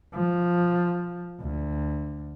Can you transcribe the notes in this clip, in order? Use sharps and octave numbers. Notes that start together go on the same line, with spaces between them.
F3
D2